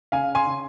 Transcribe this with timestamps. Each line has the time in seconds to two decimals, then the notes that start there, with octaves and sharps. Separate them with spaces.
0.12 C#3 F5 G#5
0.35 G#5 C6
0.47 C#3